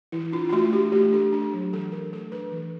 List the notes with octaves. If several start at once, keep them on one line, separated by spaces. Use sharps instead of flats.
E3 E4
D4 F4
F4
A3 F#4
D4 G4
A3 G4
D4 A4
D4
F#3
E3 A4
E3 A#4
A3 A4
D4 B4
E3